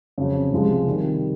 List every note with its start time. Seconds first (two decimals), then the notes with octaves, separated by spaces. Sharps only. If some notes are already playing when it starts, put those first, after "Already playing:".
0.18 F2 C#3 F#3
0.52 C2 C3 F3 G#3
0.87 C3 D#3 G3